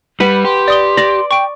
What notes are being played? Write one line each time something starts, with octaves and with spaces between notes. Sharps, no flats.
G3 B4 F#5
G4 C6
D5 D#6 G7
D5 A#6
G5 C#6 D7